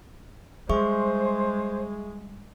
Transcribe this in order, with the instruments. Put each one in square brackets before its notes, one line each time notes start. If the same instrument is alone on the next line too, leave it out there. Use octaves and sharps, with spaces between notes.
[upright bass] G3 [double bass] G#3 [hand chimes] G#4 E5 C#6 [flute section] C5